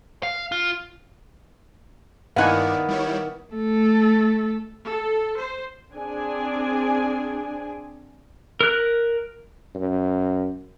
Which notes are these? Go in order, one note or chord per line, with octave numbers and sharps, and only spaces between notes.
F5
F4
G2 D#3 A#3 B3 E4 D5 F#5 G#5
G3 E4 C#5
A3 A4
A4
C5
C4 D4 G#4 G#5
A#4 F#6
F#2